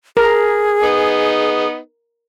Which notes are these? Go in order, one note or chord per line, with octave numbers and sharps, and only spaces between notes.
G#4 A#4
B3 D#4